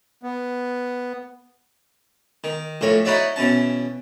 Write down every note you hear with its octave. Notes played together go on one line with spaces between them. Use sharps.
B3
D#3
A#1 A2 A#4 C#5
D#4 E4 F#4 C#5 D5 E5
B2 E3 C#4 A5